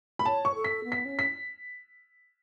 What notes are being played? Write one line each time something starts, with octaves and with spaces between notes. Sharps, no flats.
B5
C#5 A5
C#6
A4
B6
B3
B6
C#4
B6